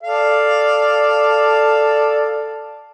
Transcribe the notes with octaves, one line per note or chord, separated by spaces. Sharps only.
A4 D5 F5